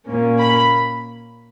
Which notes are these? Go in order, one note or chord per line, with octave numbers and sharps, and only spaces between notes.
A#2 A#3 C#4
B5